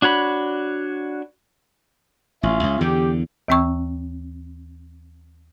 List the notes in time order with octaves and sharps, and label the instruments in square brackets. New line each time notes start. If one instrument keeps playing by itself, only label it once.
[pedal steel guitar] D4 F#4 C#5 B5
[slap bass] A1 [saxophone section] C#4 F4 E5
[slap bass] C#2
[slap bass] E2 D3 [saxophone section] G4
[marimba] D#2 E3 C4 G5 C#6 E6